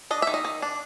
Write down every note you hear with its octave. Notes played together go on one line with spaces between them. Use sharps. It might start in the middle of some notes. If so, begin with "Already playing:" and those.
D4 D#5
D#3 E5
D#5
D#3
D4